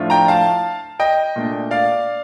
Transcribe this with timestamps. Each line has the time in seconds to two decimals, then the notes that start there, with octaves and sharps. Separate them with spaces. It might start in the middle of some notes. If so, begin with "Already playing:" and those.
Already playing: A2 F3 A3 D4 F4
0.10 G5 A#5
0.28 F5 A5
1.00 D#5 G5
1.36 A#2 A3 D4
1.71 D5 F5